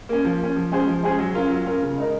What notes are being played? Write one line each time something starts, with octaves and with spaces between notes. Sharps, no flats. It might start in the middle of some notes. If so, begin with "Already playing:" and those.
A#3 C#4
F3
A#3 C#4
F3
G#3 C#4 G#4 C5
F3
G#3 C#4 G#4 C5
F#3
C#4 F4 A#4
F#3
C#4 F4 A#4
C#3
G#3 D#4 A#4